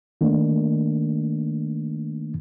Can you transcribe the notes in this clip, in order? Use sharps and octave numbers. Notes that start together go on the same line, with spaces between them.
D#3 A3 A#3 D4 D#4